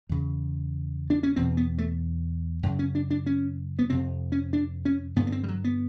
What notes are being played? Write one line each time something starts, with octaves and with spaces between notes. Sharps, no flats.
E2 C#3
D4
C#4
E2 B2 C4
B3
A3
F#2 C#3
C#4
D4
D4
C#4
B3
F2 C3 C4
C#4
D4
C#4
G2 D3 B3
B3
C4
G3
F#3
B3